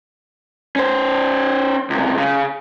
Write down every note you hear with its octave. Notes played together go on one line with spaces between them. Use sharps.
C#4 C5
C#2 C3
C#3